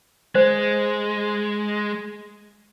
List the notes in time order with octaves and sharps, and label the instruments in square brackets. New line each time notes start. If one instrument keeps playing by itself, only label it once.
[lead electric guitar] G#3 [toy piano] C5